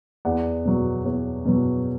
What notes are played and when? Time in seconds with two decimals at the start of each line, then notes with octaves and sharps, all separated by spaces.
0.25 E2 D5 F#5
0.65 B2 F#3
1.05 E2 C#5
1.45 B2 F#3